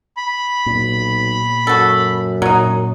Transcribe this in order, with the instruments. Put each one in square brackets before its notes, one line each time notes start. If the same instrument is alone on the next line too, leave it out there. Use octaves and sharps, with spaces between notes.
[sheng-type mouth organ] B5
[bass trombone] B1 [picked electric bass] A#2
[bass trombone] F#2 [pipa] F#4 A4
[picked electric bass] A#2 [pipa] F#3 D#4